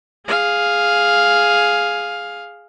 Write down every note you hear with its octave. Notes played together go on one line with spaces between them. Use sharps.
G#4 F5